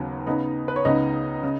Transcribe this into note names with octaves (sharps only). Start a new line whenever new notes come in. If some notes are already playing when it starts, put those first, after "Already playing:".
Already playing: D#2 C#3 F#3 B3
C#3 B3 D#4
B4
C#5
C#2 C#3 B3 D#4 D#5
C#3